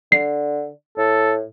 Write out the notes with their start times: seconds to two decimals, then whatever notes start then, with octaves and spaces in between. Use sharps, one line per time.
0.12 D3 C7
0.98 A2 A4